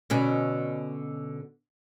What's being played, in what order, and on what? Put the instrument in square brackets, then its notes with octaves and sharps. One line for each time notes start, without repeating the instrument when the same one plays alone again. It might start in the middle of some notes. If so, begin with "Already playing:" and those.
[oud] B2 D3 C#4